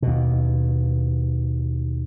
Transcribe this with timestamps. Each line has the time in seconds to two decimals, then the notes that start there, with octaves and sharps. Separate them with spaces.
0.02 D#2 B2